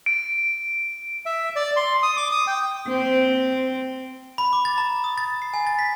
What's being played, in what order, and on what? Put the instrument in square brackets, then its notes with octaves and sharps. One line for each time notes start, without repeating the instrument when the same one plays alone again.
[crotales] D7
[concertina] E5
D5
C6
D#6
D6
D#6
G5
[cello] C4
[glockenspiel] B5
D6
A6
A#5
D#6
A6
C7
G#5
A6
B6